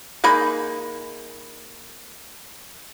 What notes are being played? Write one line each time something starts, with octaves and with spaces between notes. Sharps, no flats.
G#3 A#3 D#4 B5